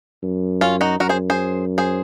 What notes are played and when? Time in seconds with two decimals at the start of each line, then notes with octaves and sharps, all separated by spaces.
0.23 F#2
0.61 C#4 F4
0.81 D#4 F#4
1.00 F#2 F#4 A#4
1.09 G#4 C5
1.30 G#4 C5
1.78 G#4 C5